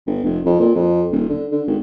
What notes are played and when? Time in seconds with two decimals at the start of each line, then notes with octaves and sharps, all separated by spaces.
0.07 G1
0.24 F1
0.46 F2
0.60 A#2
0.75 F2
1.11 D#1
1.29 D3
1.52 D3
1.67 G#1